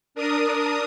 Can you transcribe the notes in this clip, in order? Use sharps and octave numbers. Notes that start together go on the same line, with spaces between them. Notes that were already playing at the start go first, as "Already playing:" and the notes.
D4 A#4 D#6